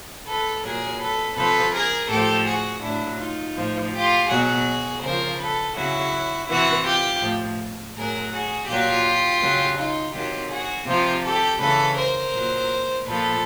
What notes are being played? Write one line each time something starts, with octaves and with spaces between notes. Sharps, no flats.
A4 B4
A#2 F#3 G#4 A#4
A4 B4
C3 F3 A4 B4
G#4 A#4
A2 F3 G4 A4
F#4 G#4
A2 F#3 D4 E4
D#4 F4
A2 F3
F4 G4
B2 F#3 F#4 G#4
C#3 F3 A#4 C5
A4 B4
C#3 F#3 E4 F#4
C3 E3 E4 F#4
F4 G4
A2 F3
A2 F#3 G#4 A#4
F#4 G#4
A#2 F#3 F4 G4
C#3 F#3
D#4 F4
C3 D#3 F#3 F4 G4
F#4 G#4
C3 F3 F4 G4
G4 A4
C#3 E3 A4 B4
A#4 C5
A#2 F#3
A#2 F3 A4 B4